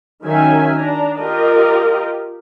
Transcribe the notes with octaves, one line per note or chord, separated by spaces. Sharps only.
D#3 F#3 C#4 E5 G#5
D4 A#5
F4 G4 A#4 D#5